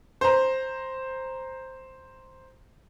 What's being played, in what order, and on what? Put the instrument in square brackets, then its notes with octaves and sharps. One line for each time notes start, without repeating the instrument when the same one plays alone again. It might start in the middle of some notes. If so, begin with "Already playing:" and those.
[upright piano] C5 A#5